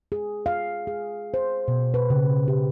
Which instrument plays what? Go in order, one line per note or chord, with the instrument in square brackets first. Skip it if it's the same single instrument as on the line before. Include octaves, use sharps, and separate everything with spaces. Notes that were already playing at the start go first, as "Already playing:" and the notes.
[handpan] G#4
F5
G#4
C5
B2
B4
C#3
G4